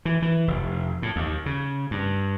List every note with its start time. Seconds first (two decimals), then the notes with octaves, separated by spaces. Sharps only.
0.05 E3
0.22 E3
0.48 F1
1.02 A2
1.16 D#2
1.46 C#3
1.91 G2